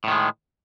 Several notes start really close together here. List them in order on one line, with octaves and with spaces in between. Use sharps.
A2 D#3 G#3